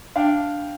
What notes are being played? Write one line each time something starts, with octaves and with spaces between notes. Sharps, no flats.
D4 F5 G5